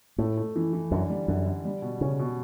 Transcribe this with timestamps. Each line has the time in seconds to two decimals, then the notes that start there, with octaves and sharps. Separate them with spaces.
0.18 A2 A3
0.37 A3
0.56 E3
0.73 E3
0.91 F#2 D3
1.10 G3
1.28 F#2 D3
1.46 D3
1.65 G3
1.82 B2
2.01 C#3 C#4
2.19 B2